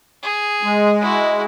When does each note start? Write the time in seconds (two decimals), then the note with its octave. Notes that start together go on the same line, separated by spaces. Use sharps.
0.23 G#4
0.63 G#3
1.02 E4 F#4